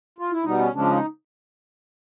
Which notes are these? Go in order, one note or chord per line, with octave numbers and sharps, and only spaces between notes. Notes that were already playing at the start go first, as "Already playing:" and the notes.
F4
E4
B2 G3 B3 D#4
C#4
C#3 F3 G#3 C#4 D4
D#4